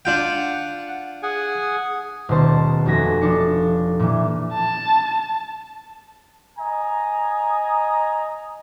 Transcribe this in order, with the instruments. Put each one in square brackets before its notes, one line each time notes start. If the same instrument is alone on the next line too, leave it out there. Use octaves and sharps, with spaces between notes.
[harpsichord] D4 F4 G5 [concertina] F#5
[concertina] G#4 F#5 G#5
[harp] D#1 B2 C5 A5
F1 A3 F#4 G#5 A#6 B6
F3 D4 C#7
A#2 E3
[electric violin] A5
[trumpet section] D#5 G#5 A#5